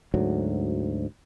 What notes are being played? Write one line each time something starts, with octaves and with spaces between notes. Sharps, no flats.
D2 G#2 F#3